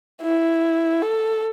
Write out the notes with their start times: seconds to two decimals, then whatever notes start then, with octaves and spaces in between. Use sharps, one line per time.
0.22 E4
1.02 A4